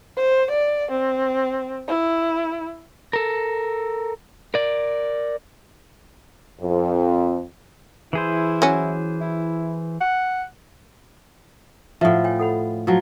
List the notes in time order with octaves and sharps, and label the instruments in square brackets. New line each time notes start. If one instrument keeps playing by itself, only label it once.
[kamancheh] C5
D5
C4
E4
[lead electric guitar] A4 A#4
A#4 D5
[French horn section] F2
[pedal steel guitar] E3 G#4 C5 [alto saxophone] E4
[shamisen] F#3 C#4
[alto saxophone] E4
F#5
[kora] A2 F3 [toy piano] E5 F#5
[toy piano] C#5 G5 G#5
A4 F#5 B5
[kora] F3 F#3